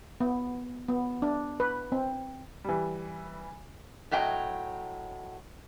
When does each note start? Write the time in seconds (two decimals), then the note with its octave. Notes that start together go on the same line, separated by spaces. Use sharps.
0.20 B3
0.88 B3
1.22 D4
1.60 B4
1.92 C4
2.64 E3 G3
4.11 A2 F#3 D#5 G5